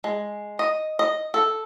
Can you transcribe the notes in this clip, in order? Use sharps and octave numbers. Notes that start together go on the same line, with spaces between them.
G#3
D#5
D#5
A4